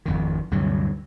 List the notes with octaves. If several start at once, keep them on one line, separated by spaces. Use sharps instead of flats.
G#1 F2 D#3
D2 G2 C3 F#3